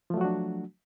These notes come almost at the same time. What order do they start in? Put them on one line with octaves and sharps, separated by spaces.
F3 A3 F#3 F#4 D4